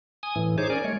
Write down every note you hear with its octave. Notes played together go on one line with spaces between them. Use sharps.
G#5 D#6
A2 E3
D#4 G#4 C5 C#5 D6
C#4 A#4 D5 G#5
G#3 A3 C#5